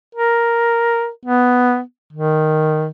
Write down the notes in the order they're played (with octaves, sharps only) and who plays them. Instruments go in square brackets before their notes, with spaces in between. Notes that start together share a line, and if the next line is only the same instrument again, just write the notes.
[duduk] A#4
B3
D#3